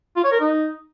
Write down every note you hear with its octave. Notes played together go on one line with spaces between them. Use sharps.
F4
C#5
A#4
D#4